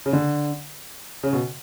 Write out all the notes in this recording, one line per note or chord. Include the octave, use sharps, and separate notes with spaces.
C#3
D3
C#3
B2